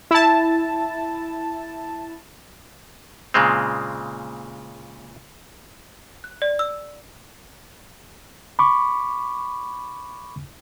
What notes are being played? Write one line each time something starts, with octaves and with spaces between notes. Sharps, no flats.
E4 A5
A#2 C#3 G#3 C4
F#6
D5
E6
B5 C#6 D6